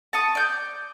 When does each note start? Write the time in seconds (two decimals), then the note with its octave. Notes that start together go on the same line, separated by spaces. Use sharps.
0.13 A5 C#6 D#6
0.35 D5 G6